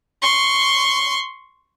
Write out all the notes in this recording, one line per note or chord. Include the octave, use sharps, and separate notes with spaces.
C6 C#6